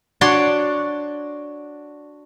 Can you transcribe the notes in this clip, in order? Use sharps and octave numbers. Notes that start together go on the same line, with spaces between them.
D4 F#4 C#5 D5 C6